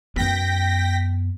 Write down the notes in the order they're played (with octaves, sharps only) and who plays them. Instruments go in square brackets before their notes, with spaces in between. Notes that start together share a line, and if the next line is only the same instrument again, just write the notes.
[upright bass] F#2 B3 [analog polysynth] G5 A#6 B6